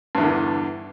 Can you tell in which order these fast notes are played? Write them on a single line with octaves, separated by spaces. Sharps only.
G2 E2 D3 E3